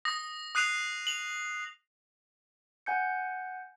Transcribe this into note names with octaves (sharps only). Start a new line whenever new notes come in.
D#6 A#6
D#6 F#6 C7 D#7 F7
F7 F#7
F#5 G#5 G6 C#7